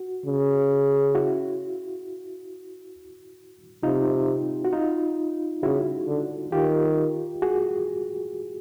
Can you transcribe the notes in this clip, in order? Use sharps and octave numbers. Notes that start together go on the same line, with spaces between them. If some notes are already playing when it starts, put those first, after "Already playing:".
Already playing: F#4
C#3
E4 F#4
C3 D#4 F4
F#4
D#4 F4
C#3 E4 F#4
D3
D#3 F4 G4
F#4 G#4